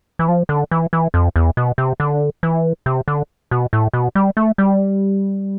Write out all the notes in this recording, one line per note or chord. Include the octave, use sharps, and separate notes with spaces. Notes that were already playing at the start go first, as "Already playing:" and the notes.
E3
F3
D3
E3
E3
F2
E2
B2
C3
D3
E3
C3
D3
B2
A2
B2
G3
A3
G3